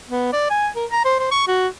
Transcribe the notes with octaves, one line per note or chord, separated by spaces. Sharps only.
B3
D5
G#5
A#4
A#5
C5
C5
C#6
F#4